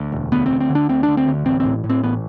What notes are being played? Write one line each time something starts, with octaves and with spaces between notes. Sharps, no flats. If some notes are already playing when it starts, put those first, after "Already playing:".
Already playing: D2
E1
D2 B3
C4
D2
C4
D3
D4
D2 C4
D3 D4
C4
D2
A1 C4
C4
A2
A2
C4
A1 B3